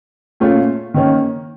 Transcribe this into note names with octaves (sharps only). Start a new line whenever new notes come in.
A#2 A3 C#4 F4
D#3 A#3 C#4